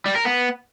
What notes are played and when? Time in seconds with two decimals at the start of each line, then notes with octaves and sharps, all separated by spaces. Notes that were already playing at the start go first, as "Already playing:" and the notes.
0.06 G3
0.16 A#4
0.25 B3